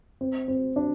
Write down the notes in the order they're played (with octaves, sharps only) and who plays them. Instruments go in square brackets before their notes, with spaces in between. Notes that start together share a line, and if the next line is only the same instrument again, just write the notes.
[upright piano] C4
C4
D4